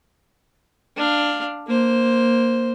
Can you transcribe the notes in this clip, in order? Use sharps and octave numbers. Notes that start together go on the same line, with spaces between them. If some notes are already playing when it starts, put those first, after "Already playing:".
D4 F5
A#3 C5